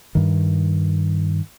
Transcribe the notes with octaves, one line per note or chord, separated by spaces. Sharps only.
G2 D#3